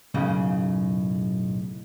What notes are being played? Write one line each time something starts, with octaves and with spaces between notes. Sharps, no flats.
B1 F#2 A2 C#3